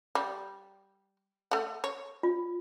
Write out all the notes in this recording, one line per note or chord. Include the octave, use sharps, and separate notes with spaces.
G3
A3 F#5
C#5
F4